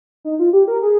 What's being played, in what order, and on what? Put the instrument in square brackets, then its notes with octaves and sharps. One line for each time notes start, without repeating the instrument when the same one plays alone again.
[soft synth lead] D#4
F4
G4
A#4
G#4